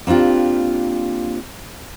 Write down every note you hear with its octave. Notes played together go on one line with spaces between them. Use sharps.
A#3 C4 D4 F4 G4